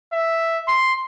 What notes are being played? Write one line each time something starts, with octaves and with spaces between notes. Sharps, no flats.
E5
C6